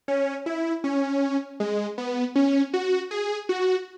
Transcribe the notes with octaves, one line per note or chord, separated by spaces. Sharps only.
C#4
E4
C#4
G#3
B3
C#4
F#4
G#4
F#4